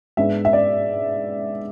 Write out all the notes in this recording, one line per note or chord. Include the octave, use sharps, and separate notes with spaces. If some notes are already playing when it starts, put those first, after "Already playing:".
G#2 G#3 B3 D4 E5
E5
D5